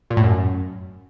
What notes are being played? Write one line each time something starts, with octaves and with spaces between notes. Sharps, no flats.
A#2
A2
F#2